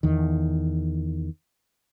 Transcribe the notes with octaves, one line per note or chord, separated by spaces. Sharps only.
E2 D#3